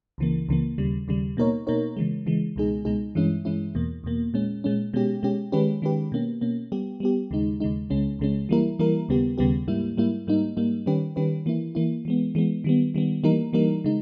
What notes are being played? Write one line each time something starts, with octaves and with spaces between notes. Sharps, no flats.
C#2 C#3 E3 A#3
C#2 C#3 E3 A#3
D#2 C#3 G3
D#2 C#3 G3
B2 A#3 D#4 A#4 C#5
B2 A#3 D#4 A#4 C#5
C#3 E3 G#3
C#3 E3 G#3
C#2 B2 G#3 D#4 G#4
C#2 B2 G#3 D#4 G#4
G2 E3 G#3 C#4 E4
G2 E3 G#3 C#4 E4
E2 B2 A#3
E2 B2 A#3
A#2 G#3 C#4
A#2 G#3 C#4
B2 G#3 C#4 G4
B2 G#3 C#4 G4
D#3 G#3 C#4 G4 B4
D#3 G#3 C#4 G4 B4
B2 A#3 C#4
B2 A#3 C#4
G3 B3 G4
G3 B3 G4
D#2 C#3 G#3 D#4
D#2 C#3 G#3 D#4
C#2 C#3 G#3 C#4
C#2 C#3 G#3 C#4
E3 G3 A#3 E4 A#4
E3 G3 A#3 E4 A#4
D#2 C#3 G3 B3 G4
D#2 C#3 G3 B3 G4
G#2 G3 A#3 E4
G#2 G3 A#3 E4
G#2 G3 A#3 D#4
G#2 G3 A#3 D#4
D#3 G3 C#4 G4 B4
D#3 G3 C#4 G4 B4
E3 A#3 E4
E3 A#3 E4
E3 G#3 B3
E3 G#3 B3
D#3 G3 B3
D#3 G3 B3
E3 G3 A#3 D#4 A#4
E3 G3 A#3 D#4 A#4
C#3 G#3 D#4